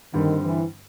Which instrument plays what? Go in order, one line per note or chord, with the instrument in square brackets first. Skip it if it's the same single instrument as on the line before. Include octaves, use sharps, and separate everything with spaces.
[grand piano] G2 D3 G3 C4 [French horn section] D#3
[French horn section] E3